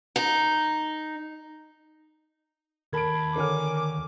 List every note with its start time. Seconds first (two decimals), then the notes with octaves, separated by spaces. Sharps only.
0.16 D#4
2.93 D#2 A#4 A5 B5 G#6 D7
3.36 D3 A#4 C#5 G#5 D6 F6